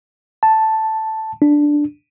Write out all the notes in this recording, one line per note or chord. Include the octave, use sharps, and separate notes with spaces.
A5
D4